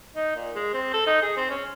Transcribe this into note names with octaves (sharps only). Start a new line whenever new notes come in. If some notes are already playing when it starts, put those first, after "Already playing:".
D#4
A#2
G#3
C4
A4
D#4
G#4
C4
C#4